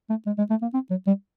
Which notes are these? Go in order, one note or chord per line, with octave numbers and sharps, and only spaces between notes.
A3
G#3
G#3
A3
A#3
C4
F#3
G3